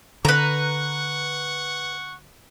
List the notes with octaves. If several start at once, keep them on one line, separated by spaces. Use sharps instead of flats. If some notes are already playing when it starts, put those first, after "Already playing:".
D3 B4 F#5 A#5 C#6